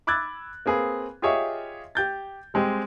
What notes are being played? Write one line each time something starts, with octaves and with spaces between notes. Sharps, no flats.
B5 D6 E6 F#6 G#6 A6
A#3 C4 G#4 B4
F4 G4 G#4 C#5 D#5 E5
G4 G6 A6
G3 G#3 C4 G4